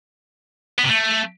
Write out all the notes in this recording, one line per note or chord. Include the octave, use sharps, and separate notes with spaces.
B3
C3
A3